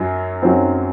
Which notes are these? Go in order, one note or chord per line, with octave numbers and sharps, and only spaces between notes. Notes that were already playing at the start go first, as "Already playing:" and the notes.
Already playing: F#2 F#3
F#2 F#3 C4